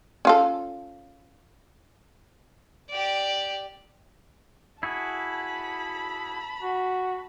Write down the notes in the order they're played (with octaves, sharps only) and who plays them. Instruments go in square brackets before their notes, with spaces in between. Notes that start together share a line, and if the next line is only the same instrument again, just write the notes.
[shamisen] C#4 F4 A4
[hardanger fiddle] G4 D5
[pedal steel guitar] E4 F#4 G#4 [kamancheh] A5 B5
[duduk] F#4